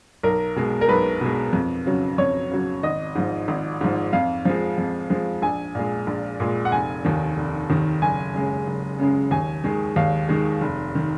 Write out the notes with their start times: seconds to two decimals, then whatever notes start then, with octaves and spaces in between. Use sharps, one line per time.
0.23 B1 A#4
0.56 B2 G#3
0.81 A#4
0.88 B1 B4
1.21 B2 G#3
1.53 F2
1.86 C#3 F#3
2.18 F2 C#5
2.51 C#3 F#3
2.83 G#1 D#5
3.15 G#2 F3
3.48 G#1
3.81 G#2 F3
4.13 F2 F5
4.45 F3 G#3
4.78 F2
5.10 F3 G#3
5.42 A#1 G#5
5.75 A#2 G#3
6.07 A#1
6.40 A#2 G#3
6.65 F#5
6.72 F1 G#5
7.05 D#2 D#3
7.37 F1
7.70 D#2 D#3
8.02 F#1 G#5
8.34 F#2 C#3 G#3
8.67 F#1
8.99 F#2 C#3 G#3
9.31 D#2 G#5
9.64 D#3 G#3
9.96 D#2 F5
10.29 D#3 G#3
10.61 F1
10.95 D#3